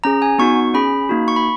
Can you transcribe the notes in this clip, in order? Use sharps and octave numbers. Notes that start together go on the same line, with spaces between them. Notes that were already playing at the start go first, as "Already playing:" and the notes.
C#4 G#4 A#5
G#5
B3 D#4 F#4 C#6
C#4 G#4 B5
A#3 D#4 F#4
C#6
B5